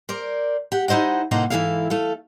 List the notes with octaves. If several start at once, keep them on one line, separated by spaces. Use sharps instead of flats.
A#4 C5 D5
G4 F#5
D#4 E4 C5 D#5 F#5
A2 C3 A#3 D#4 C5 F#5
G#2 E3 F#3 E4 A4 F5
A3 A4 F5